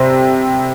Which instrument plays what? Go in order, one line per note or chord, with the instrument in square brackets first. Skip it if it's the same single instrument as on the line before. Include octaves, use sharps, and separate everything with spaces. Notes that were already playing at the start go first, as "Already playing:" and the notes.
Already playing: [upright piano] C3 G3 C4